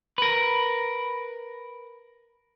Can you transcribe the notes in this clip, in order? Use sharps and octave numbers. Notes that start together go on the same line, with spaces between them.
A#4 B4